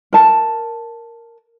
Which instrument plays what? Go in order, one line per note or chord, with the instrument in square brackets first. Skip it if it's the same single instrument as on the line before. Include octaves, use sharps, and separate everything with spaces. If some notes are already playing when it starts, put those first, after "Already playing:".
[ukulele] A#4 A5